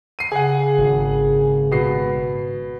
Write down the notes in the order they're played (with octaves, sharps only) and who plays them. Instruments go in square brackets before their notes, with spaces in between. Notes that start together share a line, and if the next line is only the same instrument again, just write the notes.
[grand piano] C7 D#7
[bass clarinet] C#3 [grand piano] G#4 F#5
[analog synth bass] G#1
[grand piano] B2 C7